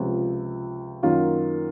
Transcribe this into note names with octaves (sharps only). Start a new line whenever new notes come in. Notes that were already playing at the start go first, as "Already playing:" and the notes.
Already playing: C#2 C3 F3
F#2 D#3 A#3 F4